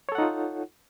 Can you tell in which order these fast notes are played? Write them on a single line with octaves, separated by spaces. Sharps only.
C#5 A4 F#5 D#4 F4